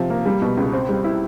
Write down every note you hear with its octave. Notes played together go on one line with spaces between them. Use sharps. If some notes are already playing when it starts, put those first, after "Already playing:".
Already playing: C3 F3
A#3
G3
B2
C#2
C4
G3
E4